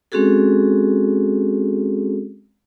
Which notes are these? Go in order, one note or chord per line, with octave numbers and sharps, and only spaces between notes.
G#3 C4 C#4 F#4 G#4 A4